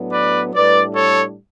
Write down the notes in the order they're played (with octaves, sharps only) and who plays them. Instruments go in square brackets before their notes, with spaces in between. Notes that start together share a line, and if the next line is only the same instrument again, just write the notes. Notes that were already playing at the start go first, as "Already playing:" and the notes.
Already playing: [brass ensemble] A2 F#3 B3 D4
B4 D5
A2 G3 D4 B4 D5
A4 C#5